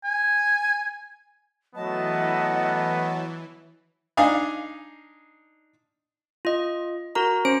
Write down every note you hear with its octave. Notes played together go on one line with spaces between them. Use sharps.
G#5
E3 F#3 A3 B3 D#5 A5
D4 D#4 F5 G#5 D#6
F4 D#5
F#4 A#4 A#5
C#4 C5 D7